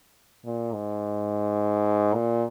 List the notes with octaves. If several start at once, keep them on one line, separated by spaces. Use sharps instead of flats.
A#2
G#2
A#2